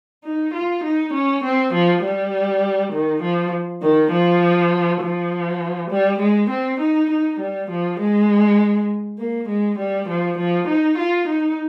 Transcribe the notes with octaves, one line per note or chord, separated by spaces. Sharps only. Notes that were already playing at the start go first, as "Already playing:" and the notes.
D#4
F4
D#4
C#4
C4
F3
G3
D#3
F3
D#3
F3
F3
G3
G#3
C4
D#4
D#4
G3
F3
G#3
A#3
G#3
G3
F3
F3
D#4
F4
D#4